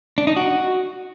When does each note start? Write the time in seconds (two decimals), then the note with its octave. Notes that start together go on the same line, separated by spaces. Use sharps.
0.18 D4
0.27 D#4
0.36 F#4